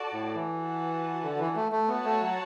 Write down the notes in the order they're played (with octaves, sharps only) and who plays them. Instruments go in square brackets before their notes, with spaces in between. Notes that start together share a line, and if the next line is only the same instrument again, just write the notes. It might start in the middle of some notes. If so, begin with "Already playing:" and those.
Already playing: [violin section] F#4 A4 D5 A5
[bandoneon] A2
E3
[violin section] F#4 B4 F#5 A5
[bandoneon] D3
E3
A3
A3
[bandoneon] B3 [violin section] F#4 C#5 F#5 A5
[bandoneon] A3
F#3